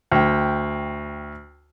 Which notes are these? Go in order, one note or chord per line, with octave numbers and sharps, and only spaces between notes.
D2 G5